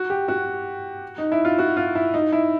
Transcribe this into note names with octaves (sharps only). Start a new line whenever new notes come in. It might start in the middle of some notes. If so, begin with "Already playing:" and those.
Already playing: F#4
G4
F#4
D#4
E4
F4
F#4
F4
E4
D#4
E4